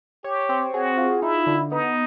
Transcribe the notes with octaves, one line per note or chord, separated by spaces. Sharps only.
G4 C#5
C4
F#4 G#4
F4
D#4 E4
D3
B3 D#4